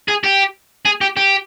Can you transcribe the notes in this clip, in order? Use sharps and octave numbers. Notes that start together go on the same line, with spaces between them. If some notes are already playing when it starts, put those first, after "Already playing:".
G#4
G4
G#4
G4
G4